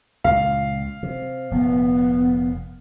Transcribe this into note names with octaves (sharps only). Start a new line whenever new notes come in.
C#2 A#2 F5
C3
F1 A#2 B3